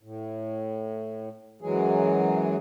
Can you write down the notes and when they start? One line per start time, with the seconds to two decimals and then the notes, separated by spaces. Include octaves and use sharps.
0.03 A2
1.61 F#2 E3 F#3 G#3 G#4